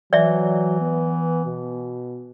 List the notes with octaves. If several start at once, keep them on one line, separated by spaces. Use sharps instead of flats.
E3 F#3 D5 E5
B3
B2